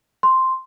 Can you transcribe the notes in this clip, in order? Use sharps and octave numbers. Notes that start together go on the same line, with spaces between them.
C6